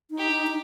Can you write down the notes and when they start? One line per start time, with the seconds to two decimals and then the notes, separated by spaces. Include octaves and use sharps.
0.11 D#4
0.18 G4
0.31 D#4
0.47 D#4